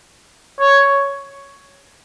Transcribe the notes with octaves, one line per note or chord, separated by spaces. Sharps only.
C#5